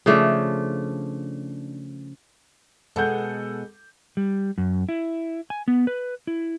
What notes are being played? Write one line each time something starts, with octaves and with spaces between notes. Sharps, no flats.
C#3 F3 A3 D4
B2 G#3 A4 F#5 G6
G3
F#2
E4
G#5
B3
B4
E4